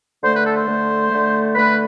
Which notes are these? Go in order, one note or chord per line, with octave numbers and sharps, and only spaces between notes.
D3 A3 C5
B4
A4
C5
D3 A3
D3 A3
D3 A3 B4